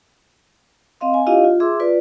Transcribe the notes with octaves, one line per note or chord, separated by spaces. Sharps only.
C4 D#5 F5 C6
G#5
D4 E4 F4 G4 D#5 F5
F4
G#4 E5 C6 D6 E6
F4 B4 D5